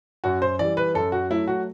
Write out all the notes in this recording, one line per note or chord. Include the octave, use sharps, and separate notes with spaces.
F#2 F#4
C5
E3 G3 D5
B4
F#2 A4
F#4
F#3 A3 E4
F#4